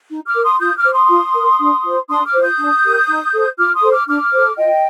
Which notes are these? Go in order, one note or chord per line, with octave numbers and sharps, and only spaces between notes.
D#4
D6 F6
A#4
C6 D#6
F4 D#6 G6
D6 F6
C5
C6 D#6
F4
A#4
D4
F4 C5
D4 C6 D#6
D6 F6
F4 C5
D#6 G6
D4
G4 A#4
D#4
A4 C5
F4 D6 F6
C6 D#6
A4 C5
D6 F6
D4 D6 F6
A4 C5
F4 D#5 G5